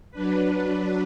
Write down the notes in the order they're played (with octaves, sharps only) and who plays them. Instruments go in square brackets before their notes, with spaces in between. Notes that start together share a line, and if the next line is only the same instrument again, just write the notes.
[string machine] F#3 D4 B4